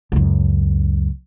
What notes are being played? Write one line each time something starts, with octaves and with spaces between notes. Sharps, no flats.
C#2 F#2